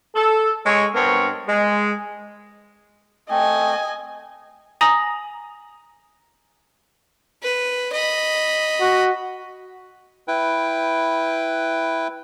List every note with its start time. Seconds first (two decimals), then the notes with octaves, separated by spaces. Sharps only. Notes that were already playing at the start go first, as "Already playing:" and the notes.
0.15 A4
0.65 G#3 C#5
0.94 G2 B3 C4 A#4 C#5
1.48 G#3
3.31 A3 C4 D#5 G#5
4.81 G#5 A#5 D#6 A#6 F#7
7.43 B4
7.92 D#5 B5
8.81 F#4
10.28 E4 B4 G5